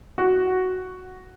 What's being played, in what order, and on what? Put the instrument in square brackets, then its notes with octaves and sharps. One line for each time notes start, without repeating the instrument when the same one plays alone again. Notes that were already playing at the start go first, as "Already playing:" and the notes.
[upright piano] F#4